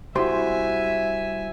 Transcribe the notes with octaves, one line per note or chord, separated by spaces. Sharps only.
C2 E4 F#4 G4 C5 E5 G#5 C6